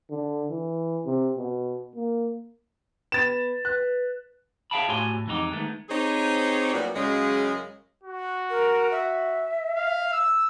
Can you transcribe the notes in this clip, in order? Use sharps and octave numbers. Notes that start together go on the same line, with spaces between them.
D3
E3
C3
B2
A#3
B3 B4 A6 E7
B4 F#6
G#4 E5 F5 G5 A5 B5
A2 F#4 G4 C#5 G#5 C6
A2
F2 E3 G#3 D#4 E4 G4
D#3 G#3 A3 B3
C4 D#4 G4 G#4 C5 C#5
A#2 F#3 G3 B3
F#2 C#3 G#3
F#4
A#4
E5
F5
E6